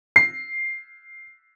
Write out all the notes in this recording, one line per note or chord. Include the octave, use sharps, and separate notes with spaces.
C7